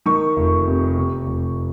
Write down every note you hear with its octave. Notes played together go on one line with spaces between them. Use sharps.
D#3 C#6
F1
C3
C3
F1